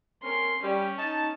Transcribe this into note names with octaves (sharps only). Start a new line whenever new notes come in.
C4 C#4 A#4 C6
G3 C#4 G4
D#4 A5